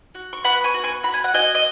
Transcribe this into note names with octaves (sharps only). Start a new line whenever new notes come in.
F#4
C#6
B3 F#5 B5
G#5 C#6
F#4
G#5 C#6
F#4 B5
G#5
F#5
F#4 D#5 G#5
D#5